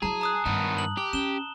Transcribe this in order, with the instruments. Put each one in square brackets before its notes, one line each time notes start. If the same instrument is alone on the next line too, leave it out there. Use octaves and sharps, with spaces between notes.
[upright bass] F#3 E4 [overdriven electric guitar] G#4 [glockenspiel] A5 A#5
[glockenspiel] A#5 D#6 F#6
[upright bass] G2 [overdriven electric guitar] D#3 B3
[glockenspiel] F#7
[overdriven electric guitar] G4 [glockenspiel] G7
[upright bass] C#4 [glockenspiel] E7 G7